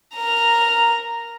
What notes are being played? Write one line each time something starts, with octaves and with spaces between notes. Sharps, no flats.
A#4 A#5